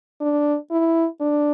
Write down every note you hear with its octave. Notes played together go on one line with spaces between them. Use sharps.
D4
E4
D4